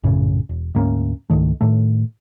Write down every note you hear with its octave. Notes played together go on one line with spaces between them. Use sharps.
A#1 F#2 A2 C#3
E1
D2 G#2 A#3 C#4
C#2 G#2 D#3 A3
A2 D#3 A3